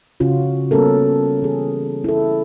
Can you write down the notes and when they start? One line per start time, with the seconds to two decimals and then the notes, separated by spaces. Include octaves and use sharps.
0.20 C#3 C#4 F4 F#4
0.71 G3 A#3 B3 C#4 A4 A#4
1.42 E3 G#4
2.04 E4 A4